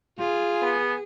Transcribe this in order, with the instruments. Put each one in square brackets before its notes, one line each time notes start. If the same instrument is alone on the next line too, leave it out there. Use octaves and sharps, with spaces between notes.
[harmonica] F4 [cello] G#4
[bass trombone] B3